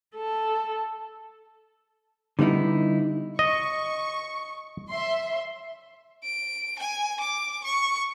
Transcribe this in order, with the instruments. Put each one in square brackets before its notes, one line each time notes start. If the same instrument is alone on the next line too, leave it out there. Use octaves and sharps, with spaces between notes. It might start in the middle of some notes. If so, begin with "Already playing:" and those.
[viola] A4
[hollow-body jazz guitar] D3 G3 B3 D#4 E4
[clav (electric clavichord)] D#5 [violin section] C#6
[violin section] E5 C6
[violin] D7
G#5
D6
C#6